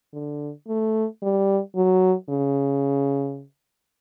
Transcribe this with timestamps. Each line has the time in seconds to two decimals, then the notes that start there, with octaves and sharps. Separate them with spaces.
0.13 D3
0.68 A3
1.22 G3
1.76 F#3
2.29 C#3